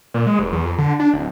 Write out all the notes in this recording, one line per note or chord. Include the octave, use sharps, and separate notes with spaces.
A#2
G#3
F1
E2
F2
D3
D4
D1